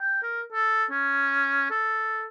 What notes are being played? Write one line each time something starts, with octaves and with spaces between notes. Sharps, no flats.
G5
A#4
A4
C#4
A4